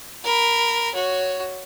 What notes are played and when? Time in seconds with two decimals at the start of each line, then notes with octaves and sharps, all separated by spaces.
0.24 A#4 B5
0.94 F#4 C#5